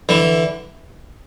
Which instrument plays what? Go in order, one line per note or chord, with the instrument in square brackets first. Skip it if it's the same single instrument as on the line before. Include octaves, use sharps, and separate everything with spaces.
[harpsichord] D3 E3